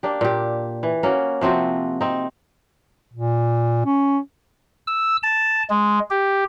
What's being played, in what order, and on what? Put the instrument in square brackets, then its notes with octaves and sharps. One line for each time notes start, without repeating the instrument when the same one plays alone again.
[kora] A#3 D4 G4
A#2 G4
E3
A#3 C#4 F#4
C3 F3 C4 F#4
C4 D#4
[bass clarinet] A#2
C#4
[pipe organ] E6
A5
G#3
G4